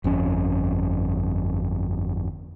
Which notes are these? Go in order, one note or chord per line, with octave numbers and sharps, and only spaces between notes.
G1 F2 C#4